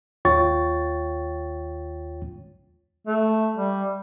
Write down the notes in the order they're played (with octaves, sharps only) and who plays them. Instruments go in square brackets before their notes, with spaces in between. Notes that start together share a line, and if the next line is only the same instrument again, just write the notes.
[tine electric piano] D#2 F4 C#5 G5 C#6 A6
[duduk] A3
G3